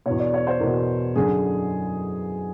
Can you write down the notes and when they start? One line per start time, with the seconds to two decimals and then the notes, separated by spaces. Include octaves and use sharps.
0.06 E2 B2 C#5
0.20 D5
0.34 C#5
0.47 C5
0.60 E2 B2 A#4
1.15 F#2 D3 G#4